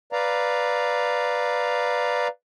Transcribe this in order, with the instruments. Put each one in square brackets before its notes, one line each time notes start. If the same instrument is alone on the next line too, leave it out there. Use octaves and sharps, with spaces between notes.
[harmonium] B4 D5 F5 A#5